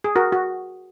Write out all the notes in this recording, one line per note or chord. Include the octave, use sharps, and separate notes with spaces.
G#4
F#4 A#4
F#4